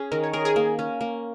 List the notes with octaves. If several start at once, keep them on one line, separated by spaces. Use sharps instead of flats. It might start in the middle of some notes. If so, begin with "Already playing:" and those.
Already playing: C#4 G#4
D#3 A#4
C#5
G#4 A#4
G#4
A#3
C#4
A#3